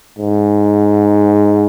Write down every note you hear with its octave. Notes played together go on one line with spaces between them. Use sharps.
G#2